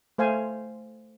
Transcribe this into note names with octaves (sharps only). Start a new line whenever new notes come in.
A3 C5 F5 G#5